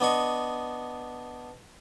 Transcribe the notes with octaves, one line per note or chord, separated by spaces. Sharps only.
B3 D4 D#5 C#6